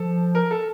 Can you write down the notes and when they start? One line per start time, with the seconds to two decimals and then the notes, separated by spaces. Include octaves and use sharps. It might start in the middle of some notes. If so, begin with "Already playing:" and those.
Already playing: F3 A4
0.35 A#4
0.51 A4